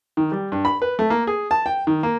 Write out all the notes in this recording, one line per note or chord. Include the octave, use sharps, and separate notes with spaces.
D#3
G3
G2
B5
B4
A3
A#3
G#4
A5
G5
D#3
A#3